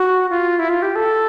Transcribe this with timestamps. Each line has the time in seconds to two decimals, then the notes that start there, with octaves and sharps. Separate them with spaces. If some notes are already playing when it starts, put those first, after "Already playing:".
Already playing: F#4
0.30 F4
0.59 E4
0.69 F4
0.82 G4
0.96 A4